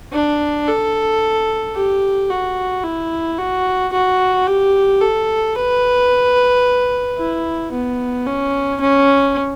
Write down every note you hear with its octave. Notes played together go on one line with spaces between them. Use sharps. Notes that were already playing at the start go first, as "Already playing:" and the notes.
D4
A4
G4
F#4
E4
F#4
F#4
G4
A4
B4
E4
B3
C#4
C#4